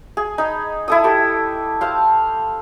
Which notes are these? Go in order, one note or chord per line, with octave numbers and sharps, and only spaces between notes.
G#4
D#4 B5
E4 A4 D#6
G4 A4
C5 F5 A5